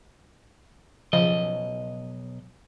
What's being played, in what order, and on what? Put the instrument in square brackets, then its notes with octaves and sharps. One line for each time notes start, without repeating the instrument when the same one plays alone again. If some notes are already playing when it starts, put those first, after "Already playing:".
[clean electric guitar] B1 D#5 [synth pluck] C#3 F3